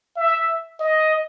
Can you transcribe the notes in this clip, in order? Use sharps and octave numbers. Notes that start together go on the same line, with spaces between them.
E5
D#5